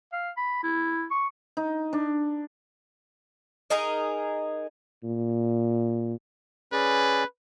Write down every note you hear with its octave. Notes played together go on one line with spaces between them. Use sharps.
F5
B5
E4
C#6
D#4
D4
D#4 G#4 A#4 D#5
A#2
C#4 G#4 B4 D5